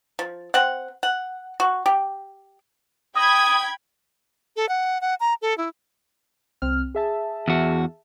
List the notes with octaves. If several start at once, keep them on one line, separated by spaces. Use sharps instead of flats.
F3
C4 F#5
F#5
F#4
G4
G5 B5 D#6 G#6
A4
F#5
F#5
A#5
A4
E4
C2 C4 F6
G#4 E5 A5
E2 F#4